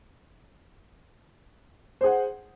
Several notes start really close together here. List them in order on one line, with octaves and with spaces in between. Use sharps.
C5 G#4 F#5